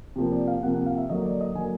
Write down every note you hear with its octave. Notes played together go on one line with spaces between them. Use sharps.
C3 F3 A#3
D5
F5
C3 F3 A#3 F#5
F#5
F5
E5
D3 F#3 A#3 D#5
D5
D#5
D3 F#3 A#3 G#5